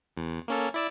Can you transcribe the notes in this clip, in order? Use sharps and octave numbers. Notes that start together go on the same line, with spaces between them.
E2
A#3 C#4 A4
E4 D5 E6